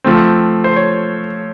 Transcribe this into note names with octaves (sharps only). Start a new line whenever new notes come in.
F3 A3 C4
C5
C#5